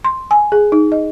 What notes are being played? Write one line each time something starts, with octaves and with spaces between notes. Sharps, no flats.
C6
G#5
G#4
D#4
D#5